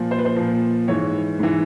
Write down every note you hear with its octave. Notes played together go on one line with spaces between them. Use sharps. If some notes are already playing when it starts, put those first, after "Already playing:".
Already playing: A#2 F3
C5
B4
C5
A#2 F3
G#2 E3 C#5
G#2 E3